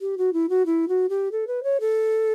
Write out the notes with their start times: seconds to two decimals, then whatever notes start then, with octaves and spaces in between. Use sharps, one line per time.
0.01 G4
0.17 F#4
0.33 E4
0.49 F#4
0.65 E4
0.88 F#4
1.09 G4
1.31 A4
1.47 B4
1.63 C#5
1.80 A4